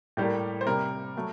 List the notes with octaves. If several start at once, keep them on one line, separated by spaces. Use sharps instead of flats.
A2 G3 A#3 G4
C5
C3 G3 A#3 A#4
F#3 A3